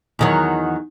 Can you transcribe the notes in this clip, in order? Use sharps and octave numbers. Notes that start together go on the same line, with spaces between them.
E2 D#3 F#3